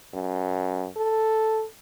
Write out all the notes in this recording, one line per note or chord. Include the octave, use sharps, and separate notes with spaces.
F#2
A4